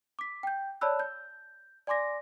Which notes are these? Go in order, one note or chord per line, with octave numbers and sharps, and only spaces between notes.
D6 B6
G5 G6
C#5 D5 A5 B5 E6 F#6
G6
D5 G#5 C6 D6 A#6